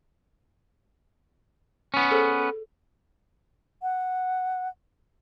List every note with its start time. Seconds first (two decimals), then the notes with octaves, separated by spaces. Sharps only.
1.94 B3 C#4
2.11 G#4 A4 C5
2.38 A4
3.82 F#5